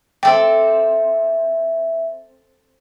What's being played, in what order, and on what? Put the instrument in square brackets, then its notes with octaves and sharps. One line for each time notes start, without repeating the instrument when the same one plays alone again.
[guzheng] C4 A4 D5 [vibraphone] E5 [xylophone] G5